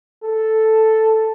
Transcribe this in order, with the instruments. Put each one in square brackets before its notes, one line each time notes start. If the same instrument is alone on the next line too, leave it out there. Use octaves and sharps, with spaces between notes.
[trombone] A4